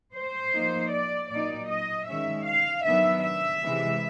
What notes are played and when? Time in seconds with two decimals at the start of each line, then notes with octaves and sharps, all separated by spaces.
0.14 C5
0.53 F3 A#3 D#4
0.92 D5
1.30 A#2 F#3 A#3 D#4 D5
1.69 D#5
2.07 D#3 G#3 C#4 E5
2.46 F5
2.85 D#3 F#3 B3 D4 E5
3.23 E5
3.63 C3 E3 G#3